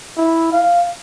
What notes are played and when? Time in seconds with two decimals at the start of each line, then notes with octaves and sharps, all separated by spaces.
0.17 E4
0.52 F5